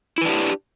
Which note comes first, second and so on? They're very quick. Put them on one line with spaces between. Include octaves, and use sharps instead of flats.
E4 B4 D4 G4